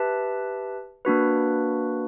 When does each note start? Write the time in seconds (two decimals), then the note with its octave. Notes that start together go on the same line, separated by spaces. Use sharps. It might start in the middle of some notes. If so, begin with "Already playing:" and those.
Already playing: G4 B4 E5 A5
1.05 A#3 D4 F#4 B4